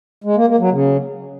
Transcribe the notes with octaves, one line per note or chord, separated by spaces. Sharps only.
G#3
A#3
A#3
F#3
C#3